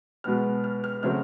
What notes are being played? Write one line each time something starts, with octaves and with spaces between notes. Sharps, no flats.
B2 G#3 B3 F6
F6
F6
C#3 F#3 A3 C4 F6